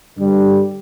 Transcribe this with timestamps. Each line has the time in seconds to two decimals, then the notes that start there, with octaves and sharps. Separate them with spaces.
0.17 G2 D3 G3